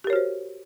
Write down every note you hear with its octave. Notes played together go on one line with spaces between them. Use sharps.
F#4 G4 A#4 C5 C#5